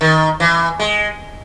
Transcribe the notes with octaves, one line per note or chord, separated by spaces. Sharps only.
D#3
E3
G#3